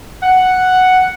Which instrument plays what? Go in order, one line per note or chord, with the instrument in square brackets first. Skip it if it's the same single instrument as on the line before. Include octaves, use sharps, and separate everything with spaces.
[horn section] F#5